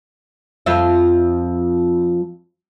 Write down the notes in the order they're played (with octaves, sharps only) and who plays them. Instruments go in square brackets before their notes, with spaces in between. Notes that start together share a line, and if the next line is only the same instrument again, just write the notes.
[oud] F2 F4 E5